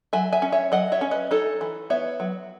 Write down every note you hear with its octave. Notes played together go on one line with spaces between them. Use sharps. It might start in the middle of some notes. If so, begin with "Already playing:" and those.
F#3 E5 G#5
E5 G#5
C#4
C#5 E5
F#3 D#5 F#5
C#5 E5
C#4
B4 D#5
D#4 A4 C#5
E3
B3 C#5 E5
F#3